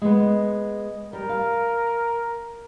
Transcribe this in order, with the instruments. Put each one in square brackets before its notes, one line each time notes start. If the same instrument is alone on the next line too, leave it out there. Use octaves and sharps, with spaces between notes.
[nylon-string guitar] G#3 B3
[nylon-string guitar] G3 [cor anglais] A#4
[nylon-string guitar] F5